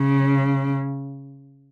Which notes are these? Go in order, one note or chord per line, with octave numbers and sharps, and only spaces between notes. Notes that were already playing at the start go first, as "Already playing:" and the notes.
Already playing: C#3